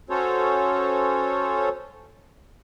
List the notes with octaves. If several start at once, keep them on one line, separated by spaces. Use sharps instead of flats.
C#4 F#4 A4 C5 C#5